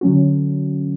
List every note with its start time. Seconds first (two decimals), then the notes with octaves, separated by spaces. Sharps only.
0.01 D3 F#3 C#4 F#4